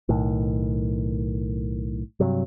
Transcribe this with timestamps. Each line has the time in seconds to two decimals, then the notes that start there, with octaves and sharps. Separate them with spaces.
0.09 B1 A2 D#3
2.20 G2 C3 F#3